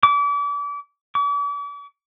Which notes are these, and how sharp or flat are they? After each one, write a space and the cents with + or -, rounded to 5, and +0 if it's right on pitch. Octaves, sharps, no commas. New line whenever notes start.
D6 -35
D6 -45